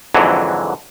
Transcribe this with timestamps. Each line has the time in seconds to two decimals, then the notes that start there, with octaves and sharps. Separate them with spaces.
0.14 F2 G#2 D3 E3 F#3